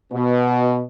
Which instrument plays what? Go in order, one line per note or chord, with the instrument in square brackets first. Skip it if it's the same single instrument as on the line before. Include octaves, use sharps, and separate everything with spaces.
[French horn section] B2